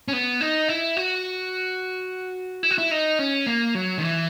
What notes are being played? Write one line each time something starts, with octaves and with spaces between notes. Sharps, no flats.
C#4
B3
D#4
E4
F#4
E4
F#4
E4
D#4
C#4
A#3
F#3
D#3
E3